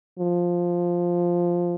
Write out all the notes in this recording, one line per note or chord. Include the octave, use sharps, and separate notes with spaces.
F3